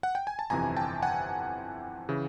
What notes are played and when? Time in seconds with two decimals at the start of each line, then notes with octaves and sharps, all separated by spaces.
0.03 F#5
0.15 G5
0.27 G#5
0.39 A5
0.50 G1 F2 C3 E3 G#5 A#5
0.77 G5 A5
1.02 F#5 G#5
2.09 C#3 E3